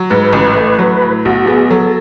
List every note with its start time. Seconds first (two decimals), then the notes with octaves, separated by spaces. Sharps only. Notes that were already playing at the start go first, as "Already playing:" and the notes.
Already playing: F#3
0.10 G#2 B4
0.33 A1
0.56 A3
0.79 F#3
1.02 A2
1.25 B1 F#4
1.47 B3 G#4
1.70 F#3 A4